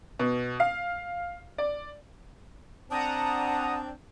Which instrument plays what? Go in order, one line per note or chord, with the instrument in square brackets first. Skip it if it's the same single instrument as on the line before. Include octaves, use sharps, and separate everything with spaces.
[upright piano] B2
F5
D5
[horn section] C4 D4 [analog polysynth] F#5 A#5 D#6 [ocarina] A5